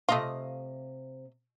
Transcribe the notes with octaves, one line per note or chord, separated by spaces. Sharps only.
C3 A3 F4 D#5 F5